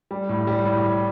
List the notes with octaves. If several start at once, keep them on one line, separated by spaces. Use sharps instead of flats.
G3
A2
G3
A2